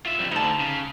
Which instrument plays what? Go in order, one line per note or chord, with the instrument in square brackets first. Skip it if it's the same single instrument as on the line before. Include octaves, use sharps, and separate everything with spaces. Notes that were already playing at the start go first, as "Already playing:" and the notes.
[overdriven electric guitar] F4 E5
F2 G3
[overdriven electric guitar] D2 D3 [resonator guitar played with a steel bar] D#4 A5
[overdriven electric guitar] C#3